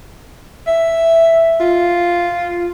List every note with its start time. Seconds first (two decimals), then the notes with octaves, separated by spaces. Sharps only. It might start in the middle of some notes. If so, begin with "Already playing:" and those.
0.67 E5
1.60 F4